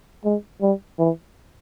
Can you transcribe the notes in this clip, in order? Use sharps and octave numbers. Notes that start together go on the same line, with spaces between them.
G#3
G3
E3